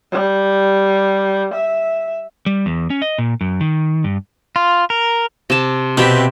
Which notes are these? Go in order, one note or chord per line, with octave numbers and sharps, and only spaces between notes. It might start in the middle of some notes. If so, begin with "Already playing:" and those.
G3
E5
G3
E2
C#4
D#5
A#2
F#2
D#3
G2
F4
A#4
C3 A5
B2 C4 G4 B4 E5 G5